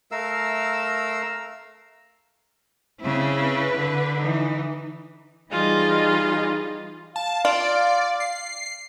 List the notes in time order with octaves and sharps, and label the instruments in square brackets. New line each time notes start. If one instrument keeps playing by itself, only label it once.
[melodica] A3 A#4 F5 E6
[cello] C#3 E4 [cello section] C4
[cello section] B4
[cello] D3
[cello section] E3 D#4
[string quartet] E3 G3 D#4 F4 G#4 D#5
[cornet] F5 [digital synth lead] A5
[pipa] F4 [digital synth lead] D5
[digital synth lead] C7